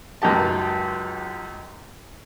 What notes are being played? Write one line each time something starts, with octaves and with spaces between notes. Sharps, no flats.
C#2 F#2 D#4 G4 A5